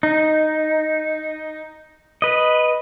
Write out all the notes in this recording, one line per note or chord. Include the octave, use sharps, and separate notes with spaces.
D#4
B4 D#5